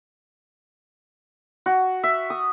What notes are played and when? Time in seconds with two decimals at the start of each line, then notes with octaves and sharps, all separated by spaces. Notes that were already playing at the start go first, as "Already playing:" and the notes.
1.66 F#4
2.04 E5
2.30 D#6